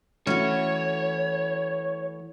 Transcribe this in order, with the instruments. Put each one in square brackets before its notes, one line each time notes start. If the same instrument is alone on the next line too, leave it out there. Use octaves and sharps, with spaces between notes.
[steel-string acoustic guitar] E3 A3 [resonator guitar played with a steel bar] C#4 F#4 [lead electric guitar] C#5